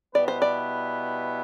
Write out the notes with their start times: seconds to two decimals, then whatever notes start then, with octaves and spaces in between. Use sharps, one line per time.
0.15 B2 G3 B3 E4 B4 D5
0.28 C5
0.42 D5